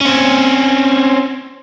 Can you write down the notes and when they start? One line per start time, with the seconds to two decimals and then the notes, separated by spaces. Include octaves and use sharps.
0.01 C4 C#4